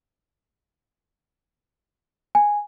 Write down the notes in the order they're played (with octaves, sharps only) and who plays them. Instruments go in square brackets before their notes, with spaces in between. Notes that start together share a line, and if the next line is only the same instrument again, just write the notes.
[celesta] G#5